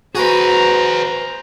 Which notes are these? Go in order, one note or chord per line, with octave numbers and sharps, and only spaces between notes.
F#4 G#4 B4 C5 A#5